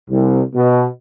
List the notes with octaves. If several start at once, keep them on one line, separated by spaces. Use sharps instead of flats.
C2
B2